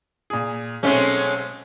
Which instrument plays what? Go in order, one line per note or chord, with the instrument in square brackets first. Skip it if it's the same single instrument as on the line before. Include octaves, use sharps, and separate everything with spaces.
[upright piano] A#2 G#4
[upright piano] B1 C4 C#5 [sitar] G#3 A3 C#4